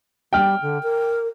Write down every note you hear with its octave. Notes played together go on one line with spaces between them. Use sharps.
G3 G5 F6
D3
A#4